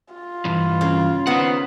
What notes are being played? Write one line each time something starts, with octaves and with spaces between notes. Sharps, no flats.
F4
G2 E3
C#3
D#3 B3 C5 F#5